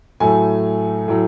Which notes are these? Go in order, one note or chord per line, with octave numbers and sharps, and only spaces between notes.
A2 F#3 A3 G#5
A2 F#3